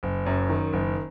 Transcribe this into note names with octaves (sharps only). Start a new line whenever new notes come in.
F#1
F#2
D#3
F#1